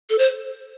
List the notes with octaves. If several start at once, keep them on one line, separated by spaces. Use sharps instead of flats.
A4
C5